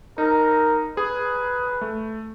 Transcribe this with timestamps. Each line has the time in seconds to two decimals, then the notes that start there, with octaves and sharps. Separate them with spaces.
0.18 D#4 A#4
0.97 G#4 B4
1.81 A3